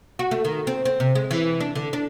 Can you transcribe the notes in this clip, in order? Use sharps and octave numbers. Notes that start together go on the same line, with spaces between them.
F#4
A3
D#3
C4
C4
C3
G#3
E3
D4
D3
D4